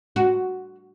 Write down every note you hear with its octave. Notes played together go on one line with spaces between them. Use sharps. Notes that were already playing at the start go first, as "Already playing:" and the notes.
F#4